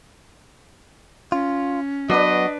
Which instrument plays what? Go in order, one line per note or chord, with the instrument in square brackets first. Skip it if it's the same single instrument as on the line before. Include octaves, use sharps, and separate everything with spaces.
[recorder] C#4 [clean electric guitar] F4
[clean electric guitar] F#3 B3 F#4 [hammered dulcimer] D4 B4 [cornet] D#5